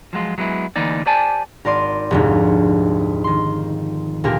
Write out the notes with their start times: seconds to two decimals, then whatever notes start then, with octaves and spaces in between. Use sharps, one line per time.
0.13 F3 F#3 G#3 F4
0.38 F#3 G#3 B3 E4
0.76 D2 E3 A#3 D#4 D5
1.06 G4 C5 D5 G#5 A5
1.65 G#1 A#4 D5 C6 D#7
2.11 F1 D2 G#2
3.24 D#3 C6
4.24 D2 A#2 A#3 G4 A#4